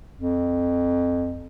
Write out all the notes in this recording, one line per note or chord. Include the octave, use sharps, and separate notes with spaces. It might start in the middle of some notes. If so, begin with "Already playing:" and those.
F2